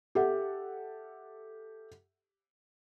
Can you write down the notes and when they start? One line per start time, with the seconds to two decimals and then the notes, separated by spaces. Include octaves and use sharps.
0.15 G4 A4 E5 F#5